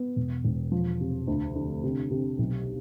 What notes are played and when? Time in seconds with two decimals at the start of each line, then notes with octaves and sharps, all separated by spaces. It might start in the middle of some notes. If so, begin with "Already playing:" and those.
Already playing: B3
0.16 E1
0.44 E1
0.72 F3
1.01 C3
1.27 D2
1.55 D3
1.84 C3
2.11 C3
2.39 B1